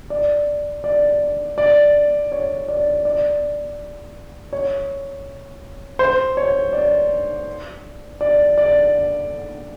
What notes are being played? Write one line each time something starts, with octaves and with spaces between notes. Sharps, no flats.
D5
D5
D5
C#5
D5
D5
C#5
C5
C#5
D5
D5
D5